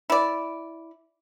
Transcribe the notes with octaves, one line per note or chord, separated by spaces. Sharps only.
E4 D5